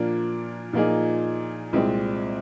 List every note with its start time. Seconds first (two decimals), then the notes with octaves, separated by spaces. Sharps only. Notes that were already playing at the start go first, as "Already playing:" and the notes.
Already playing: A#2 F3 A#3 D4
0.73 A#2 F3 A#3 D#4 G#4
1.73 C2 A#2 G#3 C4